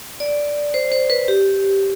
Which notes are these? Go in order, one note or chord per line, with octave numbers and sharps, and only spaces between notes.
D5
C5
C5
B4
G4